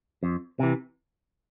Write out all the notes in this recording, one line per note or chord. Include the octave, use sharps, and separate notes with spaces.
F2
C3 E3